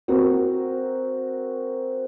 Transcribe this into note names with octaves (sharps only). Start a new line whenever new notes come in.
C4 F#4 A#4